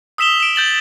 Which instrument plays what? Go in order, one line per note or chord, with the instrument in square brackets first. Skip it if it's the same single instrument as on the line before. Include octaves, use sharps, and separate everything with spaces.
[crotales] D#6 E6 B6 E7 F7 G7
D7 E7
G6 A6 F#7 G7